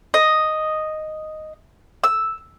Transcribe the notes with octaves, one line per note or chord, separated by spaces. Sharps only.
D#5
E6